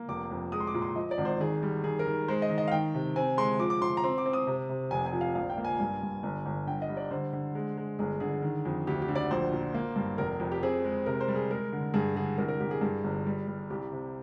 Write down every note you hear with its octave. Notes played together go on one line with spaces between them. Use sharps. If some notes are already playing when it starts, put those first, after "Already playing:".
Already playing: A#3
F1 D6
F2
G#3 D#6
C6
D6
A#2
C6
F3 D#5
D5
G#1
C5
D#3 G#4
G3
D#3 G#4
A#4
D#3
G#3 C5
D#5
D#3
D#5
F5
D#3 G5
C3
C4 G#5
G#3 C6
F3 D6
D6
F3 C6
A#5
C4 C6
D6
C4
D#6
C3
C3
F1 G#5
G#5
F3
F5
A#1 F5
G5
A#3
G#5
G2
G2
G1
G1
D3 G5
D#5
G3
D5
D3 C5
D3
G#3
G#3
G1 G#4
D3 G#4
D#3
F2
D2 G4
G4
D3
D5
A#1 C5
A#2
A#3
G2
F1 A#4
F2
G4
C4 G#4
G#3
C3 A#4
C5
G3
G#4
G#3 A#4
D3
G2 G#4
D3 G#4
C2 A#4
A#4
C2 G4
G#4
G2
G1
G3
G3
C2 G4
C3